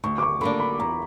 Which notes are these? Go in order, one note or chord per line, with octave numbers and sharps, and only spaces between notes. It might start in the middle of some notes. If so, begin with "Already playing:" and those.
D2 C#6
D6
C#6
D3 A#3 D4 B5
B5
E2 A#5